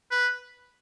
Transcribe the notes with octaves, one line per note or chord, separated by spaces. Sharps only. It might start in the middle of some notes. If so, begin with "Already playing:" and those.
B4